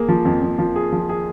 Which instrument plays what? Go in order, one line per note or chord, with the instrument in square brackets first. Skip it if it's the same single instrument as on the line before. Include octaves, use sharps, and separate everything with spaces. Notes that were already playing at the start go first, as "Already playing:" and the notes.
Already playing: [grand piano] A#3 G#4
F3
F2
F2
F3
G#4
F3
G#4